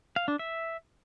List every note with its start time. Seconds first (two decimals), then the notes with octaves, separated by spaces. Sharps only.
0.16 F5
0.28 D4
0.39 E5